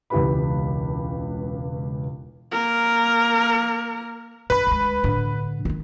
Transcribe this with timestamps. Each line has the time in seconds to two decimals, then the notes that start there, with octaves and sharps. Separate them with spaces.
0.10 E1 C#2 E3 G4 B4 B5
2.51 A#3 A#4
4.50 G2 B4 B5
4.67 D2 G#3
5.04 A2 D3
5.65 D#3 B3